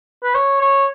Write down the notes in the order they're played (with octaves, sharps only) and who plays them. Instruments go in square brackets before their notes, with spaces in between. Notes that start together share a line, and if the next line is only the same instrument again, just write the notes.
[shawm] B4
C#5
C#5